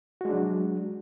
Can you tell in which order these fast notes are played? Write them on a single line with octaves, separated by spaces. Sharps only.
F#4 G#3 D4 F#3